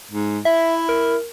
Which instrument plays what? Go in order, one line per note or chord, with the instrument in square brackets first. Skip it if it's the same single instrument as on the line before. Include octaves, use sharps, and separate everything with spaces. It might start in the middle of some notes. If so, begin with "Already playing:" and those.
[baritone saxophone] G#2
[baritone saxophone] E4 [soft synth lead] E5
[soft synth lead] A#4